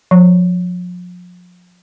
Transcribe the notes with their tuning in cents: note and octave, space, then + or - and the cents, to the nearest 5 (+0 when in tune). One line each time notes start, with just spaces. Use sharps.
F3 +35